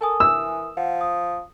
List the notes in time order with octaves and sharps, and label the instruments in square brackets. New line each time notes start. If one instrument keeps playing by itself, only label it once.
[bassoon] A4 [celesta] A#4 G#5 D#6
[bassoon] E3 [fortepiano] E6
[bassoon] F3 [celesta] F#5
[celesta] D#6